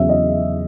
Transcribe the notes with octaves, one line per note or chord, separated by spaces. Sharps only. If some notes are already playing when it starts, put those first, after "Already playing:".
Already playing: E2 C#3 F#3 E5
D#5